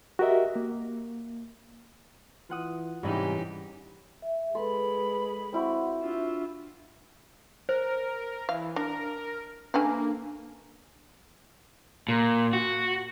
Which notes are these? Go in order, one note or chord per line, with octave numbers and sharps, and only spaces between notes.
F#4 G4 A#4 D#5 E5
A#3
E3 F4 F#5 D#6
G#2 C3 E3 G3 C#4 D#4 E4 G4
E5
G#3 A4 B4 B5 C6
C4 E4 F#4 F#5 C6
D4 F4 E5
A#4 C5
E3 F5
D4 A#4
A3 A#3 C#4 D4 B4 F5 G#5
A#2
F#4